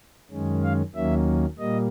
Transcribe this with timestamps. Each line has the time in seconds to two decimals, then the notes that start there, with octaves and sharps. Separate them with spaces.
0.31 F#2 D#3 G#3 C#4
0.63 F5
0.95 D#2 D#3 F#3 A#3 C#4 E5
1.58 A#2 G3 A#3 D#5